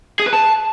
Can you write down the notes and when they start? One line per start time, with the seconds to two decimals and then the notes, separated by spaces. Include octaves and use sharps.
0.20 G#4
0.26 B4
0.33 A5